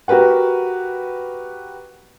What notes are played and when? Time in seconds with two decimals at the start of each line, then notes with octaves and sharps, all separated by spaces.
0.08 F#4 G4 A#4 B4 F#5